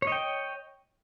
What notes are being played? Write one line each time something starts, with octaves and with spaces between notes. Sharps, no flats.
C#5 D#5 G5